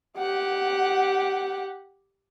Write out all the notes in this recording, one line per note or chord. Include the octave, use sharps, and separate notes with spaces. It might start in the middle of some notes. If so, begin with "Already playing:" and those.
G4 F#5